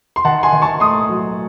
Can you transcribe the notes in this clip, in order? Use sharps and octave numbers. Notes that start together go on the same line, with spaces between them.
C6
D#3 F#5 A5
G#5 C6
D#3
A5 C#6
A3 C6 D#6
F#3